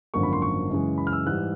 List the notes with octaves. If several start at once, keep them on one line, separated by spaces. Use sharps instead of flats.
G#1 F#2 D3 F3 A#3 C#6
B5
C6
C#6
F#2 C#3 E3 G#3
B5
F6
E6
G#2 E3 G3 F#6